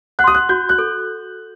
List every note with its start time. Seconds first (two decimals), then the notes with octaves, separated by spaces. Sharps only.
0.19 F#5 F#6
0.24 C6 D#6
0.34 F#6
0.49 F#4 G6
0.69 F#6
0.79 A4